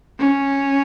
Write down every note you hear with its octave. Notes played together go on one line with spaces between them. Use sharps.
C#4